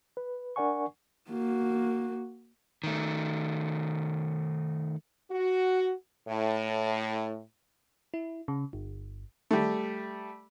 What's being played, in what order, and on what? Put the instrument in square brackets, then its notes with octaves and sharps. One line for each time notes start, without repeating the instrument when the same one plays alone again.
[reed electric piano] B4
D4 A#4 D5 F#5 G#5 C#6
[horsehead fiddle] A#3 F#4
[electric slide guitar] D#3 A3
[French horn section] F#4
A2
[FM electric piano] E4
C#3
G1
[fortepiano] G3 A3